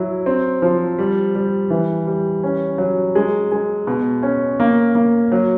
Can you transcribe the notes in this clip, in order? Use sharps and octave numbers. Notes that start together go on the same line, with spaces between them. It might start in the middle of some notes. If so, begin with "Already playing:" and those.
Already playing: F#3 E4
C4
F3
G3
G3
E3
G3
C#4
F#3
G#3
G#3
B2
C#4
A#3
A#3
F#3